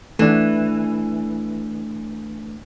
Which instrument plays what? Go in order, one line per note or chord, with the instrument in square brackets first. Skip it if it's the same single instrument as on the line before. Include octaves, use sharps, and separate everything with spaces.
[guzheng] E3 [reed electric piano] A3 D4